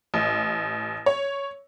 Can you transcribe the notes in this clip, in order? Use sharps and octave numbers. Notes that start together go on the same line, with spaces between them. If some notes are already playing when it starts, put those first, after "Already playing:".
A1
C#5